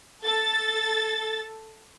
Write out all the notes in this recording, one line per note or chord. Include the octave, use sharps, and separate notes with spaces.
A4 A6